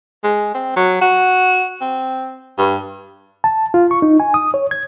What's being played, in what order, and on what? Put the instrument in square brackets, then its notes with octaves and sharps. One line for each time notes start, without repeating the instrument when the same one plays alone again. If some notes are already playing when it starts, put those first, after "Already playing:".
[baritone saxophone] G#3
C4
F#3
F#4
C4
G2
[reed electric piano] A5
F4
C#6
D#4
G#5
D#6
C#5
G#6